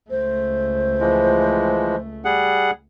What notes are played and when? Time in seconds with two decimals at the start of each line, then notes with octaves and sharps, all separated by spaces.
0.10 C#2 A3 C5
1.00 E3 F3 G#3
2.25 G3 G#4 F#5